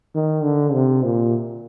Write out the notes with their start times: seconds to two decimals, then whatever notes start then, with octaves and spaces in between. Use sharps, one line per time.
0.15 D#3
0.43 D3
0.73 C3
1.04 A#2